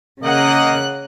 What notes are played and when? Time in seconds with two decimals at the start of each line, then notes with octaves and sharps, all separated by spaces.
0.24 C#3 A#3 D#5 F#5 F#6